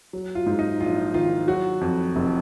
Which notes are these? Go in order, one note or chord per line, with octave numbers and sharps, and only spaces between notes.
F#3
F4
G#2
D#4
A#1 F4
D#3 F4
F#3 F#4
F2
F1